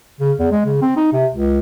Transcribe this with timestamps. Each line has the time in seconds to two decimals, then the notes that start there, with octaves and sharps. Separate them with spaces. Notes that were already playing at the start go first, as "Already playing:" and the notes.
0.20 C#3
0.39 E2
0.51 G#3
0.66 C#3
0.82 C4
0.96 D#4
1.13 C3
1.34 C#2